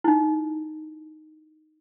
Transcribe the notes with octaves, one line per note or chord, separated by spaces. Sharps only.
D#4 E4